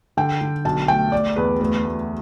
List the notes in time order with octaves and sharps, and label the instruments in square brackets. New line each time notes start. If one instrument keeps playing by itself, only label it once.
[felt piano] D3 G5
D3
B1 A5
A3 G5
A3 D5
E2 B4
D2 B4
A3